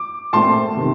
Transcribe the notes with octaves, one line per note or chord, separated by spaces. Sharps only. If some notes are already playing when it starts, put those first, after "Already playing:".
Already playing: D6
A#2 A3 C4 A5 C6
C3 D#3